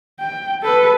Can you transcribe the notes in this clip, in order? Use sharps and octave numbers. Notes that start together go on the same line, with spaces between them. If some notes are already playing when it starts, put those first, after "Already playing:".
G5
A4 B4